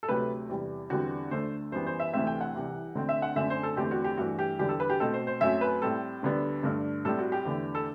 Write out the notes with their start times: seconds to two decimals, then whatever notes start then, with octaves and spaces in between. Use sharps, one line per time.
0.03 A4
0.09 D2 C3 F#3 A3 B4
0.49 E2 C3 G3
0.90 E2 D3 G3 C4 F#4
1.31 D2 D3 A3 C5
1.72 F#2 E3 G3 B3 C5
1.86 C5
2.00 E5
2.13 D2 C3 E3 A3 C4 E5
2.27 G5
2.41 F#5
2.54 C2 C3 E3
2.95 D2 D3 A3 C4
3.09 E5
3.22 F#5
3.36 F#2 D3 A3 C4 E5
3.50 C5
3.63 A4
3.77 E2 D3 A3 C4 G4
3.91 F#4
4.04 G4
4.18 G2 E3 A3 F#4
4.39 G4
4.59 E2 D3 G3 G4
4.69 A4
4.80 B4
4.90 G4
5.00 B2 A3 C4 A4
5.14 C5
5.27 C5
5.40 F#2 F#3 A3 C4 E5
5.61 B4
5.82 A2 G3 C4 A4
6.23 D2 D3 G3 B3
6.63 G2 D3 A3
7.05 A2 G3 C4 A4
7.19 F#4
7.32 G4
7.45 E2 D3 A3
7.75 A4